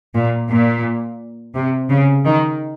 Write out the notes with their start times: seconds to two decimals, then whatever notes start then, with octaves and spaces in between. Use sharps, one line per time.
0.15 A#2
0.49 A#2
1.54 C3
1.89 C#3
2.25 D#3